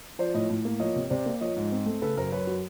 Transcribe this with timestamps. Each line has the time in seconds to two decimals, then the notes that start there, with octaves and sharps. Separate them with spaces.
0.19 F3 C5 D5
0.34 A2 C#5 D#5
0.50 A2
0.65 A#3
0.80 F3 C#5 D#5
0.96 C3
1.10 C3 C5 D5
1.26 A#3
1.41 F3 C#5 D#5
1.57 G#2
1.72 C4
1.86 A3
2.02 C#3 A4 B4
2.17 F#2 A#4 C5
2.32 F#2 B4 C#5
2.47 F#3